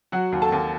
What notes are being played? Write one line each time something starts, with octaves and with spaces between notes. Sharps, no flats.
F#3 F#4 F#5
D#2
A4 A5
D#2